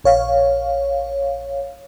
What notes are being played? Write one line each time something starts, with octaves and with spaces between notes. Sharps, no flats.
A#1 C#5 F5